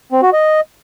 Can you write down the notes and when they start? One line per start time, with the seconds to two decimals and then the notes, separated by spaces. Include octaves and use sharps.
0.12 C4
0.23 F#4
0.33 D#5